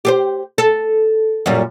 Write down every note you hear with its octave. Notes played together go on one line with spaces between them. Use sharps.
G4 G#4 C5
A4
F#2 A#2 G3